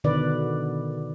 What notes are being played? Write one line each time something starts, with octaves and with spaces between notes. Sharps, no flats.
B2 D3 D#3 B4 D5